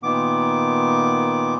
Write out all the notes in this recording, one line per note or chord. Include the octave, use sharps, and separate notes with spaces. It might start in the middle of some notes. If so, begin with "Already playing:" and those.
A#2 D#3 B3 D6